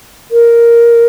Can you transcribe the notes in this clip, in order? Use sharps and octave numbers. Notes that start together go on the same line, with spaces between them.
A#4